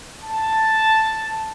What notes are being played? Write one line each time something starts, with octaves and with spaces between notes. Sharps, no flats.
A5